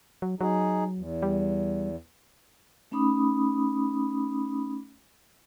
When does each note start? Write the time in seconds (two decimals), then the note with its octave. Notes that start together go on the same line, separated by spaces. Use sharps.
0.22 F#3
0.41 F#3 D#4 G#4
0.96 E2
1.23 G3
2.91 A3 C#4 D#4 B5 D6 D#6